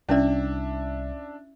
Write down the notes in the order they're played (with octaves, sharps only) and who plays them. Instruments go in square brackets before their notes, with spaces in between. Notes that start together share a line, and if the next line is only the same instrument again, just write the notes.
[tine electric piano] C2 [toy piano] C#4 E4 D5 [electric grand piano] D4 E5